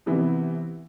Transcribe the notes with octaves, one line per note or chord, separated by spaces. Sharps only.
C3 E3 B3 E4